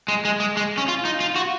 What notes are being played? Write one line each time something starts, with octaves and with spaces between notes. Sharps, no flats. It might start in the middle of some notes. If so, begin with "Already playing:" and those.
G#3
G#3
G#3
G#3
C#4
F4
D#4
F4
F#4